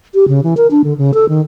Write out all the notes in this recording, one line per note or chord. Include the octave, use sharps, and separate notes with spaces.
G4
C#3
E3
A#4
D4
D3
C#3
A4
D#3